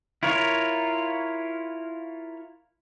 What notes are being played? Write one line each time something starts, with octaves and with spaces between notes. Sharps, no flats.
E4 F4 A#4 C#5